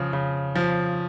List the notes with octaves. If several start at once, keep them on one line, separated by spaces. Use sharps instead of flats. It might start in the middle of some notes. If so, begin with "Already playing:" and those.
Already playing: C#3 F3
C#3
F3